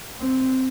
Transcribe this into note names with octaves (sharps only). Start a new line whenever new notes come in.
C4